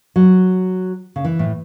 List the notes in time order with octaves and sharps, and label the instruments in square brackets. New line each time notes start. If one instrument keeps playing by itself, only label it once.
[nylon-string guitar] F#3
C#3
E3
A2